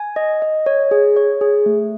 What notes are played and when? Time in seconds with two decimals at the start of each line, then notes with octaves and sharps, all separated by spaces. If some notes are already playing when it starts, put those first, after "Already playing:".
Already playing: G#5
0.16 D#5
0.42 D#5
0.66 C#5
0.91 G#4
1.16 C#5
1.41 G#4
1.66 A3